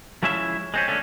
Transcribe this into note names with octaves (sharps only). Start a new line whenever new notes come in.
F3 G#3 C#4 E4 E5
G#3 C4 C#4
D3 A3 C#4